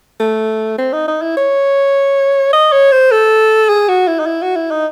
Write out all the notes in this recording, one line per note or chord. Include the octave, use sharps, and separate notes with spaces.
A3
C4
D#4
D#4
E4
C#5
D#5
C#5
C5
A4
G#4
F#4
E4
D#4
E4
F#4
E4
D#4